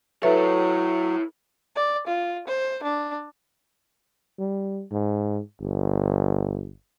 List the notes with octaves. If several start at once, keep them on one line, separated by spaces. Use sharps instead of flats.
F#3 E4 A4 B4 C#5 E5
D5
F4
C5
D4
G3
G#2
G1